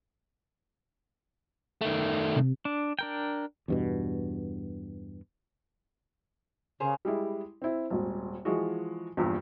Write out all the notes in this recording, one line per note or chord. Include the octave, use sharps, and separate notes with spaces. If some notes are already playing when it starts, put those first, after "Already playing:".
D#3 A3
C3
D4
D4 A#4 G5
E2 G2 B2
C#3 G#4 A#4 C5
G3 G#3 E4
C4 E4
D#1 G#1
E3 F3 G#3 F#4
A#1 E2 G2 A#2 G3